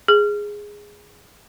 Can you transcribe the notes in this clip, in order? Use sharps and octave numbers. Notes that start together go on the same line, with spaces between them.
G#4